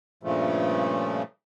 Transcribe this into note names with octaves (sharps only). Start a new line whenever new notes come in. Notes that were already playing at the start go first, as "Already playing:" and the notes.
G2 A#2 C#3 F3 A3